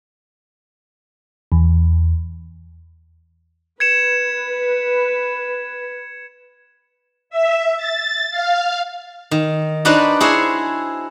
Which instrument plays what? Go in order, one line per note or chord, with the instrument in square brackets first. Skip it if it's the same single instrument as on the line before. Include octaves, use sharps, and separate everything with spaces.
[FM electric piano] E2
[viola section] B4 [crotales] G#6 C#7 E7
[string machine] E5
A6
F5
[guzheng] D#3
D4 D#4 F#4 B4 C5 D5
E4 F#4 G#4 C5 C#5